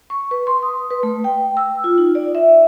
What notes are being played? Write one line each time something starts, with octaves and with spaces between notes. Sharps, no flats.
C#6
B4
C6
D#6
B4
A3
G5
E6
F4
D#4
D5
E5